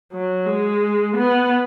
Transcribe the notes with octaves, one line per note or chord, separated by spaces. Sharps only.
F#3
G#3
B3